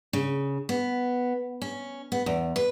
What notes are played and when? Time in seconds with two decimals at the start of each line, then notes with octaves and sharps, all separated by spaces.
0.13 C#3
0.69 B3
1.62 C#4
2.12 B3
2.26 E2
2.56 B4